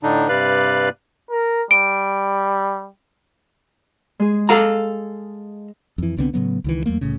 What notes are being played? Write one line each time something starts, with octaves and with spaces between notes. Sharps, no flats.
A2 D3 D4 D#4
G2 C3 B4 D5 F5 F#6
A#4
G3 D7
G#3 G#4
A4 F5 A#5
F2 E3
C2 D3 B3 C4
A2 C#3 F#3 B3
C#2 D#3 E3
E2 F#3 A3 A#3
C2 A2 C#3